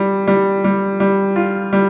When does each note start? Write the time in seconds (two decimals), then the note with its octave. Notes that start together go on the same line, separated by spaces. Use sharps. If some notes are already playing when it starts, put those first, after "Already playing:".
Already playing: G3
0.28 G3
0.64 G3
1.00 G3
1.36 F4
1.73 G3